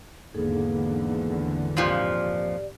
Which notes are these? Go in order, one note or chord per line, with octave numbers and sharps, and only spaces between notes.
G#1 E2 D3 A#3 D#4 G#4 A4
F2 A#2 F3 G4 D5